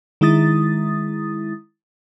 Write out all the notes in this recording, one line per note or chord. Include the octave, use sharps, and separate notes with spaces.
D#3 G#3 E4 D#6 A6